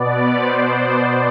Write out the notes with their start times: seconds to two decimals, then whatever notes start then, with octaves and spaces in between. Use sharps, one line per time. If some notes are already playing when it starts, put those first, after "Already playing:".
Already playing: B2 B3 D5
0.37 C5